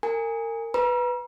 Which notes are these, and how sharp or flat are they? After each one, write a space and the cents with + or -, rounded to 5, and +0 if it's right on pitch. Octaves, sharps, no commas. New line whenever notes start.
A#4 -35 G#5 -15
B4 +0 A#5 +40